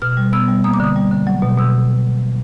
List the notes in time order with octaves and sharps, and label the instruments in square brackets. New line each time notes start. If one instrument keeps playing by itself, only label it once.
[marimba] B2 F6
G3
B3 E6
G3
A#3 D#6
D6
D3 D#6
G3
D3
F#3
B2
B2 E6